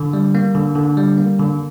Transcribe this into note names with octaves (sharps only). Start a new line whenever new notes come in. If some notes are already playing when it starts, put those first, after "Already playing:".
Already playing: D3
G3
A#3
D3
D3
G3
A#3
D3